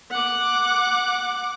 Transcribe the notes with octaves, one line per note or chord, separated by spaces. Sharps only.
F#5 D6